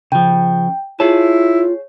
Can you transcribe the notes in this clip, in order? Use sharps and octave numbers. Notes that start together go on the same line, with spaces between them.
C#3 F3 G5
E4 F4 G#4 C#5 A5